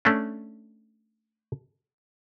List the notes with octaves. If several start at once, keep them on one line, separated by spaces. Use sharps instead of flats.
A3 C#4 D4